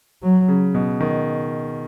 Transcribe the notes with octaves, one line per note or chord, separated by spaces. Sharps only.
F#3
C#3
B2
D#3